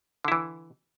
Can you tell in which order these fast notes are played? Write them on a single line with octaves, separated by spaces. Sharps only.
D3 E4 E3